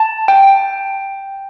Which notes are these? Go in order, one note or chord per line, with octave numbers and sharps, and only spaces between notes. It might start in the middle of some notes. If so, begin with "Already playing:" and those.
Already playing: A5
G5